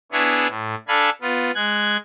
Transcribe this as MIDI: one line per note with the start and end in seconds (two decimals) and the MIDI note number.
0.12 0.48 59
0.12 0.48 62
0.12 0.48 64
0.12 0.48 68
0.12 0.48 73
0.48 0.75 45
0.88 1.10 62
0.88 1.10 69
0.88 1.10 77
0.88 1.10 80
0.88 1.10 83
1.21 1.51 59
1.21 1.51 65
1.55 1.97 56
1.55 1.97 90
1.55 1.97 92